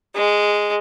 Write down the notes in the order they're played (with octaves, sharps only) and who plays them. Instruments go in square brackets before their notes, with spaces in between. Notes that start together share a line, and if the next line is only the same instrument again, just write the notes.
[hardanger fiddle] G#3